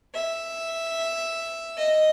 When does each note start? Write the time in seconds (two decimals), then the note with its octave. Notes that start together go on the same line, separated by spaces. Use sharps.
0.14 E5
1.77 D#5